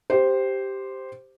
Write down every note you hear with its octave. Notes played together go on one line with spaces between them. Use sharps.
G4 C5